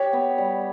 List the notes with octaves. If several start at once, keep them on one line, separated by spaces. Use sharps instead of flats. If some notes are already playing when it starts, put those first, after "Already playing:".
Already playing: G4 C#5
B3
G3